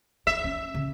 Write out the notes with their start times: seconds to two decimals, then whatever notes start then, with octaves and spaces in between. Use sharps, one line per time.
0.27 D#4 E5
0.44 C#4
0.74 C#3 C#4